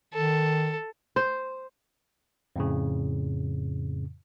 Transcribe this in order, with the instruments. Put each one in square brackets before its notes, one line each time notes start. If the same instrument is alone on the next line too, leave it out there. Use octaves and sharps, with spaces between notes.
[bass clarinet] D#3 [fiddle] A4
[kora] C5
[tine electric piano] F2 A2 C#3